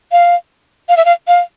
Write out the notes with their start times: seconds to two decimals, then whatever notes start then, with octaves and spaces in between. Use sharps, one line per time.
0.12 F5
0.89 F5
0.97 E5
1.05 F5
1.28 F5